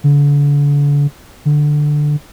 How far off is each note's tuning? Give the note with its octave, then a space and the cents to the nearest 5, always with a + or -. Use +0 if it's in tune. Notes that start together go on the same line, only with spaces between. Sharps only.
D3 -35
D3 +10